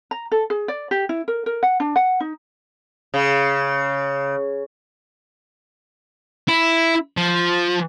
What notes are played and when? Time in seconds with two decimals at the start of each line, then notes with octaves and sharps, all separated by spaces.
0.11 A#5
0.32 A4
0.50 G#4
0.68 D5
0.91 G4
1.09 E4
1.28 A#4
1.46 A#4
1.63 F#5
1.80 D4
1.96 F#5
2.20 D#4
3.14 C#3
6.48 E4
7.17 F3